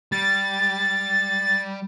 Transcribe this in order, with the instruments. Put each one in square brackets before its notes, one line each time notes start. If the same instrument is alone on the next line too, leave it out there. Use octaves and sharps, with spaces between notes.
[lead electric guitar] G3 [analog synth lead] A6